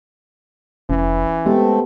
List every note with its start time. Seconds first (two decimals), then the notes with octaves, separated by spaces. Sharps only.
0.90 F1 E3 C#4
1.46 G#3 A3 B3 C4 G4 A4